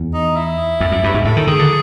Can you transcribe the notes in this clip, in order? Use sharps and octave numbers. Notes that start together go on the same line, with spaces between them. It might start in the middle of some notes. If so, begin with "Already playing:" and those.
Already playing: E2
D#4
E4
F2
F#2
G2
G#2
A2 A4
D#3
D#3 G#4
D3